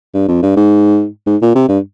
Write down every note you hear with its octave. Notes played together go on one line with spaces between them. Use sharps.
G2
F2
G2
G#2
G#2
A#2
C3
G2